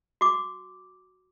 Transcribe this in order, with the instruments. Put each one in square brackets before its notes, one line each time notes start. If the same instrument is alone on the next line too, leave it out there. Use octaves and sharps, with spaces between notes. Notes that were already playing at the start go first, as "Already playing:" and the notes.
[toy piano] F#4 D6